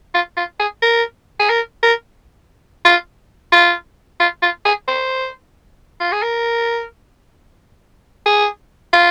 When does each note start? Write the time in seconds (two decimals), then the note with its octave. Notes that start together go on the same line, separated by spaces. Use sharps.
0.14 F4
0.37 F4
0.59 G#4
0.82 A#4
1.39 G#4
1.49 A#4
1.83 A#4
2.85 F4
3.52 F4
4.20 F4
4.42 F4
4.65 G#4
4.88 C5
6.00 F4
6.12 G#4
6.22 A#4
8.26 G#4
8.93 F4